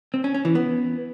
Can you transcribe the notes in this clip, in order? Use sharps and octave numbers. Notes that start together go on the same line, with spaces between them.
C4
C#4
C#4
E3
B3